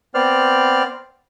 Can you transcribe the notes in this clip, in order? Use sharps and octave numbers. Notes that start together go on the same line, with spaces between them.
B3 C4 C5 D5 F6